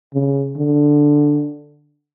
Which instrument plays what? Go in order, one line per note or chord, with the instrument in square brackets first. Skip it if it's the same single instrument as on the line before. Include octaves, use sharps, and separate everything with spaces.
[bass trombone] C#3
D3